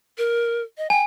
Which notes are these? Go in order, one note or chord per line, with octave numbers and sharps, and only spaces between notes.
A#4
D#5
G5 G#5